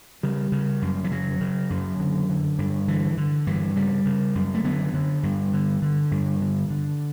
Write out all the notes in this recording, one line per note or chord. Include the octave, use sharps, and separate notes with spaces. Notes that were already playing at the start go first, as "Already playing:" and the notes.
C#3 G3
C#3
F#2
E3
C#3 F#3
C#3
F#2
D3
D3
G2
D3 E3
D3
G2 E3
C#3 G3
C#3
F#2
A3
D3 B3
D3
G2
D3
D3
G2
D3
D3